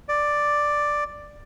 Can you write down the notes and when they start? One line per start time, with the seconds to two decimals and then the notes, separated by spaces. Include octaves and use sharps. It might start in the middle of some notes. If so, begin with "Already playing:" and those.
0.09 D5